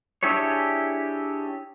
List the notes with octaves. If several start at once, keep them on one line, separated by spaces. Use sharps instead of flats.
D4 E4 G4 G#4 C#5